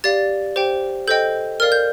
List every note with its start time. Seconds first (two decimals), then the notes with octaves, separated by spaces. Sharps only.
0.04 G4 D5 F5 A6
0.56 G4 C5 G5
1.08 A4 C5 D#5 G5 G6
1.60 A#4 D5 F5 F6
1.72 G6